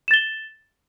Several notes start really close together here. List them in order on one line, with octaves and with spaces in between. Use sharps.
E7 A6 G7